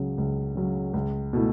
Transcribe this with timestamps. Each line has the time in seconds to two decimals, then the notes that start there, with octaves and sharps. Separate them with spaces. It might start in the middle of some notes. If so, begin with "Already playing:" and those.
Already playing: C#2 C#3 F#3 C#4
0.18 C#2
0.55 C#3 F#3 C#4
0.93 C#2
1.33 B2 A3 E4